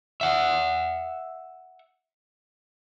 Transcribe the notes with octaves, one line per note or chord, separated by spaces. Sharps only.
E5 F#5